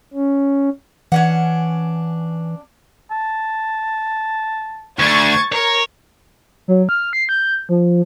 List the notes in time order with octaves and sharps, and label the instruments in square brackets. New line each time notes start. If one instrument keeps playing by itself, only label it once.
[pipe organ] C#4
[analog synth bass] E3 [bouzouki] C#4 D4 F#5
[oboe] A5
[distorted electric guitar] D2 [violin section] C#6 G#6 A6
[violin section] A#4 [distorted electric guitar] C#5
[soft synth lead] F#3
F6
C7
G6
F3